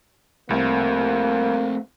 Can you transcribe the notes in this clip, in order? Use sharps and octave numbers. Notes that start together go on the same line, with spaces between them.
C2 A3 A#3 C4